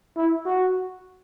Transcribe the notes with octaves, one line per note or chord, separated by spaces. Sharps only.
E4
F#4